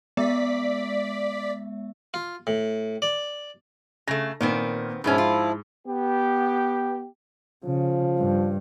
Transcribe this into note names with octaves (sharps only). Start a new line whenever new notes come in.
G#3 B3 D5 E5 B6
F4
A2
D5
C#3 A3 A#6
A#2 D#3 B3 C4
G#2 B2 F3 B3 C#4 E4
F4
B3 G4
C#3 F3
G2